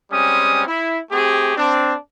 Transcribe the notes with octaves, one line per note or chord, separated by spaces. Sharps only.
G3 G#3 C4 C#4 D#6
E4
A3 C4 G4 G#4
C4 D4